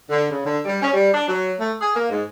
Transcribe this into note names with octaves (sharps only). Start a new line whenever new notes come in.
D3
C#3
D3
G3
C#4
G3
D4
F#3
A3
G#4
A#3
G#2